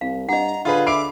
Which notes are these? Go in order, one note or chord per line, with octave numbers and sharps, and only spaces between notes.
C2 F5
G2 D#5 F#5 A#5
D3 F4 G#4 B4 B5
E5 B5 D6 C7 D7